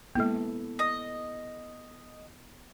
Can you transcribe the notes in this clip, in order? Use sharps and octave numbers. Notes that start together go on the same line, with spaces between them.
G#3 A#3 B3 E4 A4
D#5